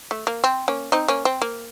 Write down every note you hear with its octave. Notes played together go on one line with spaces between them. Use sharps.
A3
A#3
C4
A#3 C#4
C4 D#4
A#3 C#4
C4
A#3